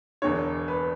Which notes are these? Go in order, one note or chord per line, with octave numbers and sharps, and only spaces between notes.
E1 E2 D3 C#5
B4